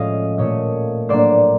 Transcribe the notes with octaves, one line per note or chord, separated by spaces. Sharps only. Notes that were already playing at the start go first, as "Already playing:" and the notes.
Already playing: A2 F3 G#3 C#4 D#5 F5
A#2 F3 A3 C#5 D#5
A2 F#3 A#3 D4 C5 D5